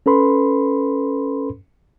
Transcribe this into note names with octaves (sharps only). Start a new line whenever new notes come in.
C#4 A4 B4 B5 C6